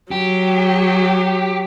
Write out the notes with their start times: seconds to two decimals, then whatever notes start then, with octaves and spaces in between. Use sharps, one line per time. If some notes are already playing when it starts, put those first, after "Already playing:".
0.11 F#3 G4